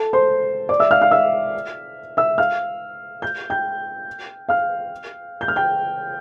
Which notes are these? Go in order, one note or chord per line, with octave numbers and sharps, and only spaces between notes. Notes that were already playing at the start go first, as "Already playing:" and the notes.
Already playing: A4 A5
C5 C6
D5 D6
E5 E6
F5 F6
F5 F6
E5 E6
E5 E6
F5 F6
G6
G5 G6
F5 F6
G6
F6
G5 G6